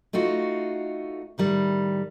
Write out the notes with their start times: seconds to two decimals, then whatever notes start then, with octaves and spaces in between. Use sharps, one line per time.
0.13 A3 D#4 F4 F#4
1.38 A2 D#3 G3